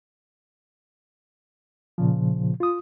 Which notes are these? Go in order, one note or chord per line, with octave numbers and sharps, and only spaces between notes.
A#2 C#3 F3
F4 D#6